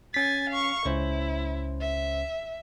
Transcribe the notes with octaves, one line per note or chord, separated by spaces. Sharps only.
C#4 G#5 A6 B6
F5 C#6
C#2 C#4 E4 C5
E5